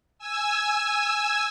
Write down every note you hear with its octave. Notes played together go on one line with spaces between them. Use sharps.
G#5 E6